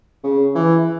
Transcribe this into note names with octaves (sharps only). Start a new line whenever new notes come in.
C#3
E3